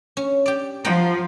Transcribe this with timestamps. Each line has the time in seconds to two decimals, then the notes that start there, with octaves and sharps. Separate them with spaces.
0.17 C#4
0.46 G4 D5
0.85 F3 F#5 G5 A#5